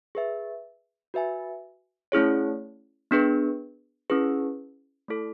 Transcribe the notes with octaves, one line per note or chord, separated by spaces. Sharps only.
G#4 B4 E5
F#4 B4 E5 G#5
A3 C#4 E4 G#4 C#5
B3 D4 G#4 B4
C#4 E4 G#4 B4
A3 E4 A4